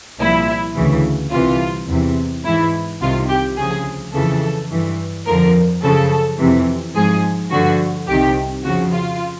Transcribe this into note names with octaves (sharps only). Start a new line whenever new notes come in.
C2 A#2 F3 E4
D2 C#3 E3
C2 C3 E3 F4
E2 C3 E3
G#2 E3 E4
C2 C3 D#3 F4
G4
D2 C#3 F3 G#4
F2 C#3 E3 A4
G2 E3
F2 D3 F3 A#4
F#2 C#3 F3 A4
F2 C3 E3
G#2 F3 G#4
G2 D3 F3 F#4
C2 C3 D#3 G4
F2 C#3 F3 F#4
F4